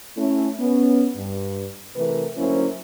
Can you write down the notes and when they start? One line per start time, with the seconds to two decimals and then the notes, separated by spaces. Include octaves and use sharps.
0.17 A3 C#4 E4
0.60 B3 C#4
1.16 G2
1.96 C3 E3 A3 A#4 B4
2.38 D2 F#3 A#3 C#4 E4 C5